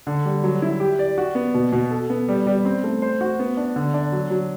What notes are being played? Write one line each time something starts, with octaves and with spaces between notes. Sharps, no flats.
D3
G3
F#3
E4
G4
D5
F#4
B3
B2
B2
A4
B3
G3
G3
C4
A3
C5
F#4
B3
D4
D3
D4
F#3
F#3